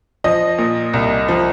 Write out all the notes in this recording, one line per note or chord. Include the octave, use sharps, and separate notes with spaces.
F3 D#5
A#2
C2
F3